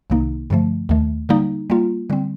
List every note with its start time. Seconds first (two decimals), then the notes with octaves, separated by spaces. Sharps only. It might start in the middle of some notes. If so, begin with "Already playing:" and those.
0.10 C2 C3 D#3 A#3 D#4
0.50 G2 D3 F3 A3
0.89 D#2 D#3 A3
1.29 D3 G3 A#3 D#4
1.70 G3 A#3 F4
2.10 D3 G3 C4